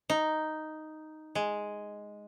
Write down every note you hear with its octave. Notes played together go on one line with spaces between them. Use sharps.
D#4
G#3